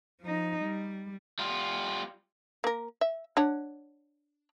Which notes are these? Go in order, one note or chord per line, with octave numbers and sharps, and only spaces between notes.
F3 D#4
G3
G3 F4
A#3 A#4
E5
D4 C#5 F#5